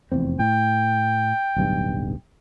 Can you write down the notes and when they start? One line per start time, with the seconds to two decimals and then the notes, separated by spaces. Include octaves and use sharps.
0.12 F1 E2 C4
0.39 A2 G5
1.56 D1 B1 G2